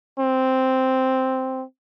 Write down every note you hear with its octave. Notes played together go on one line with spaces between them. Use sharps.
C4